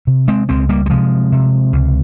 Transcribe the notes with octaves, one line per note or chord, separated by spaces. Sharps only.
C3
G#3 C4
C#2 G#3 C4
G3 A#3
G3
C3 F3 G#3
C3
C#2